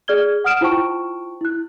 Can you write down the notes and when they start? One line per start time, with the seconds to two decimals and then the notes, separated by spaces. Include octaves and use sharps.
0.08 G#4 D5 F6 G#6 G7
0.44 F#5 D#6 F6 D7 E7
0.61 E4 F4 C5 G5 A5 C#6
1.41 E4 F#6